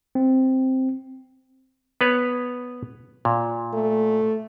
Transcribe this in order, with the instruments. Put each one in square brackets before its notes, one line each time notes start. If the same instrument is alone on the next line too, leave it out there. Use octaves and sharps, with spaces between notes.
[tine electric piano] C4
[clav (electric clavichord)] B3 B4 C#5
A#2
[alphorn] A3